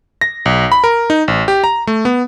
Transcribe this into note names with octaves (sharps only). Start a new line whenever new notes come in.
A#6
B1
B5
A#4
D#4
A1
G4
A#5
A3
B3